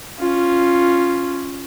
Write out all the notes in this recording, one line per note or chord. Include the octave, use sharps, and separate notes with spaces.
C#4 F4